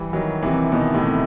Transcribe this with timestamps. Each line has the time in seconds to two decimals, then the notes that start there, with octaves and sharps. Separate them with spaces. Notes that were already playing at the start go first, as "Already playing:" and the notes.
Already playing: E3 G3
0.13 D#3 F#3
0.43 C3 E3
0.72 B2 D#3
0.94 A2 C3